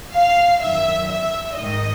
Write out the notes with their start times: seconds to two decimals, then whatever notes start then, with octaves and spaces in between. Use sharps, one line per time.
0.14 F5
0.61 F#2 D#3 E5
1.10 E5
1.58 G#2 D#3 D#5